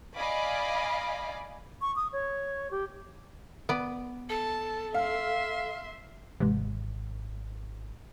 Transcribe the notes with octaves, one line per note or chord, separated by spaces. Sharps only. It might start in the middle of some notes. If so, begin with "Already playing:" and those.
D5 D#5 F5 G#5 B5 D6
C#6
D#6
C#5
G4
B3 D5
A4 A5
E5 F5 C6
G#1 C3 E3 G#3